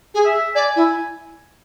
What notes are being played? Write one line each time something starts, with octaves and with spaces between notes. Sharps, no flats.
G#4
E5
D5 G#5
E4